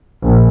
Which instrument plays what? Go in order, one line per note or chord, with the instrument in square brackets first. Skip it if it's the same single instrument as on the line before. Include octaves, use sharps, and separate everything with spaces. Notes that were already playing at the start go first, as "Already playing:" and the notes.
[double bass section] A#1